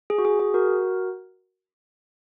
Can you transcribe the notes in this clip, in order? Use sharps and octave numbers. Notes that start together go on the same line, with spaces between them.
G#4
F#4
G#4
G#4
F#4 A#4